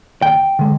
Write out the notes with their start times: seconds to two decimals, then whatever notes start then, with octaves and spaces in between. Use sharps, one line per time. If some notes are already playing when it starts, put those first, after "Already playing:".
0.22 D#2 G5
0.59 D3 G#3